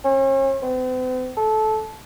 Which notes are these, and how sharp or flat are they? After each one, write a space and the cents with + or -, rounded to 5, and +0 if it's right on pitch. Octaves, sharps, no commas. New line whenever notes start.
C#4 -40
C4 -45
A4 -20